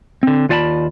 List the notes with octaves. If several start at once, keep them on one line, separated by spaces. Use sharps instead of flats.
D3 C4
D#2 F4 D5 F5 A5 B5